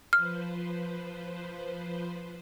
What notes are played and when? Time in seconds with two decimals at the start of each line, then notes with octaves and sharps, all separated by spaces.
0.13 F3 B4 C5 F6